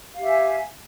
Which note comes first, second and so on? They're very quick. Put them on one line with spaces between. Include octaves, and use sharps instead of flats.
F5 G4 E5 G#5